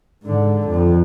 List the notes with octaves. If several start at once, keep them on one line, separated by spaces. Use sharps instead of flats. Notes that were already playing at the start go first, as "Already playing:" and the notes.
G#2 D3
F2